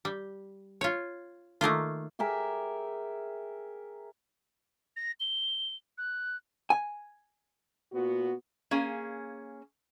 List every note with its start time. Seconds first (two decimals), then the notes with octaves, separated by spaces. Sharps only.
0.05 G3
0.81 F4 C#5
1.61 D#3 A3 A#3 F4
2.19 G4 G#4 A#4 E5
4.97 A#6
5.20 G7
5.98 F#6
6.70 G#5
7.92 A#2 B3 F#4
8.71 A#3 C#4 G#4 F5